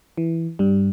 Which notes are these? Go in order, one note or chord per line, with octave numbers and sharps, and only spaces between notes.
E3
G2 G3